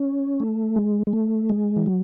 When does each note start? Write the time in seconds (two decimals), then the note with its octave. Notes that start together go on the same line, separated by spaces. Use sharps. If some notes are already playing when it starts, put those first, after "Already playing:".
Already playing: C#4
0.40 A3
0.76 G#3
1.07 G#3
1.13 A3
1.50 G#3
1.76 E3
1.86 F#3